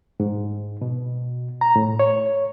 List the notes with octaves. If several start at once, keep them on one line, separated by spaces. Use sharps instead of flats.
G#2
B2
A#5
A2
C#5